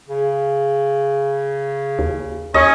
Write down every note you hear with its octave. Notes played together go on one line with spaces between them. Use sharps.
C#3
D#2
D#2 C#4 D#5